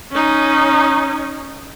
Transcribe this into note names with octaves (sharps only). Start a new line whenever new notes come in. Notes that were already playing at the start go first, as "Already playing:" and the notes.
C#4 D#4